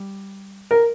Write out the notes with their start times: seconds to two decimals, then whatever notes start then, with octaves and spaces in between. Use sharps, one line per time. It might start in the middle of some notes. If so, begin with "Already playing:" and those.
Already playing: G3
0.71 A#4